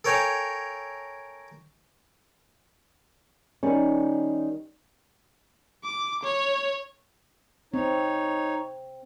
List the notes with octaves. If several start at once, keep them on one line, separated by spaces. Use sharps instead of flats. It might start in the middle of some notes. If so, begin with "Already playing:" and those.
A4 A#4 C#5 G5 G#5
D#3 G3 C#4
D6
C#5
C4 D#4 C#5